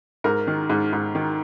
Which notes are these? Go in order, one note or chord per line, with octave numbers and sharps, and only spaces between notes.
G#2 A#4
D#3
G#2
G#2
D#3